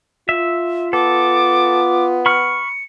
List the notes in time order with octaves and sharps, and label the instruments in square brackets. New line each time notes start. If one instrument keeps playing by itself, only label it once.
[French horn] F4 [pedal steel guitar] E5
[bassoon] B3 [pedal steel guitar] A4 [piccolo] D6
[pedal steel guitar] B5 C#6 F6 [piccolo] C#7